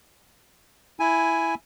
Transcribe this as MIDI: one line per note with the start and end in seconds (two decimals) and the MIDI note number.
1.00 1.55 64
1.00 1.55 80